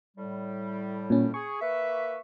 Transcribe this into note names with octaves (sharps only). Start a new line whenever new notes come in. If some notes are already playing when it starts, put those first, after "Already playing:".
A2 G3
A#2 C#4
G#4 C#6
A#3 B4 E5